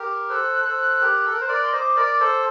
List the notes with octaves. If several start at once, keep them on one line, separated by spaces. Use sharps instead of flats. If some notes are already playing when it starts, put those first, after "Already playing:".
Already playing: G4 A#4
A4 C5 F#6
A4 C5
G4 A#4
A4
A#4
C5
A#4 D5
C6
C5 D#5 D6
A#4 D5
A4 C5